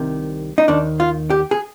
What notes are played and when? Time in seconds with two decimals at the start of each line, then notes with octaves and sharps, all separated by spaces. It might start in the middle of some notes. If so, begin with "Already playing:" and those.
Already playing: C2 C3 D#3
0.58 D#4
0.68 D#2 D#3 D4
1.00 F4
1.30 G4
1.51 G#4